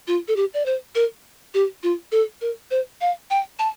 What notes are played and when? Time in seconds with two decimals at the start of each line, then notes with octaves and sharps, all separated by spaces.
0.07 F4
0.28 A4
0.36 G4
0.54 D5
0.66 C5
0.95 A#4
1.54 G4
1.83 F4
2.12 A4
2.41 A#4
2.71 C5
3.01 F5
3.30 G5
3.59 A5